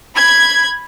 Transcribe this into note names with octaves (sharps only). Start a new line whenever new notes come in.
B5 G#6